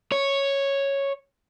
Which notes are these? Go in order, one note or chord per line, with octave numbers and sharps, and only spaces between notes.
C#5